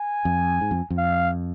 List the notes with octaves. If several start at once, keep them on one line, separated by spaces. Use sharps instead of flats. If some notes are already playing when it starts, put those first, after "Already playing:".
Already playing: G#5
F2
G#2
F2
F2
F5